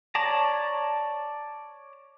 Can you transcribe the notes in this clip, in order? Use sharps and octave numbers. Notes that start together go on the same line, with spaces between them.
C#5 D5 A5 A#5